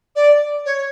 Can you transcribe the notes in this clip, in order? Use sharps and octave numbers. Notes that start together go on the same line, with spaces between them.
D5
C#5